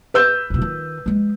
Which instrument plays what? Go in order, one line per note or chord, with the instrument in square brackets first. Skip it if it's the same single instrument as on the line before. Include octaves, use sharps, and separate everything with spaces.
[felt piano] B4 E6 G6
[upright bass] D#1 B2
D#3 F4
F3 G#3